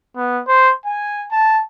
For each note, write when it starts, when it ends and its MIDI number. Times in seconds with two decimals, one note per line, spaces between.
0.16 0.41 59
0.48 0.72 72
0.86 1.25 80
1.31 1.60 81